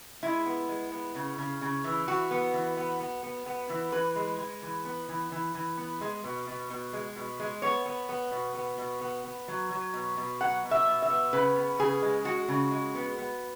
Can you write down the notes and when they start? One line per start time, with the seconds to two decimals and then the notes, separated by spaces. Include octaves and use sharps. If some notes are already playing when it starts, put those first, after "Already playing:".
0.23 G#3 E4
0.46 B3
0.69 G#3
0.92 B3
1.15 C#3
1.38 C#3
1.61 C#3
1.84 E3
2.08 E3 F#4
2.31 B3
2.54 E3
2.77 B3
3.00 B3
3.23 B3
3.46 B3
3.70 E3
3.92 E3 B4
4.16 G#3
4.38 G#3
4.62 E3
4.85 B3
5.09 E3
5.32 E3
5.54 E3
5.77 B3
6.01 G#3
6.24 B2
6.47 B2
6.70 B2
6.93 G#3
7.16 B2
7.39 G#3
7.62 B3 C#5
7.86 B3
8.09 B3
8.32 B2
8.55 B3
8.78 B2
9.01 B3
9.24 B3
9.48 F#3
9.71 F#3
9.94 B2
10.17 B2
10.40 F#3 F#5
10.64 B2
10.71 E5
10.87 B2
11.02 E5
11.10 B3
11.33 C#3 B4
11.56 B3
11.79 C#3 G#4
12.02 G#3
12.25 G#3 F#4
12.48 C#3
12.71 G#3
12.95 B3
13.18 B3